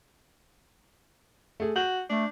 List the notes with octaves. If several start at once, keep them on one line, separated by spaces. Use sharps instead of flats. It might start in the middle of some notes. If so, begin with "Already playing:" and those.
A3 G#4
F#4 G6
A3 D4